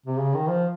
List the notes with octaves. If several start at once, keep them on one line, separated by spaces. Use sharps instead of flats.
C3
C#3
D#3
F3